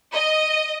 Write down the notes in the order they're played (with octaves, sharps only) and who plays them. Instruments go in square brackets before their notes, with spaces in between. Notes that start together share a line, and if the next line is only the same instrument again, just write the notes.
[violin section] D#5